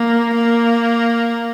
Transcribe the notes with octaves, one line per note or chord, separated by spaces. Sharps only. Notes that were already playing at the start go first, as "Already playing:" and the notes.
Already playing: A#3
A#3